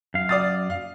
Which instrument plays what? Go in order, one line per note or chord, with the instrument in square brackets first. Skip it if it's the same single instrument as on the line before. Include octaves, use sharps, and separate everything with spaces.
[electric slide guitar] F#2 F5
[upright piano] D5 D#6 A6
F5